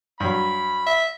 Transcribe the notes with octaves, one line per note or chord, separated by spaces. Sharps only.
G2 F#3 B5
E5